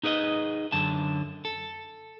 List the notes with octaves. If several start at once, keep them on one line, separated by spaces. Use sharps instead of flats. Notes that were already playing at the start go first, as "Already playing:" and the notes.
D#4 G#4 B4 D5 D#5
F#2 D3 A5
A4